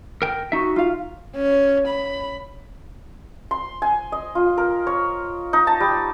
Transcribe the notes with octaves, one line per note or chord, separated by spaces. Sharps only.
A#4 G5
D#4 F#4 E5
F4 F5
C#4
B5
C6
G#5
D#5
F4
A#4
C#5
D#4
A5
G3